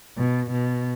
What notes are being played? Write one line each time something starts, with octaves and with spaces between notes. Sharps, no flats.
B2
B2